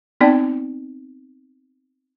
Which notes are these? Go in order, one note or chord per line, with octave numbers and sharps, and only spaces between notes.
B3 C4 D#4 D5 G5 A5